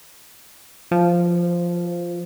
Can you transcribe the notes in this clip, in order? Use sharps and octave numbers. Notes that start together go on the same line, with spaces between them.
F3